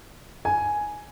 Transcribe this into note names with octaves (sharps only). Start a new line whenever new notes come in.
G#5